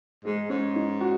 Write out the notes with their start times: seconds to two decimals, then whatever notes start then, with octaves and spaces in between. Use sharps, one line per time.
0.25 G#2 G#3
0.50 G#2 C#4
0.76 D#4
1.01 F#4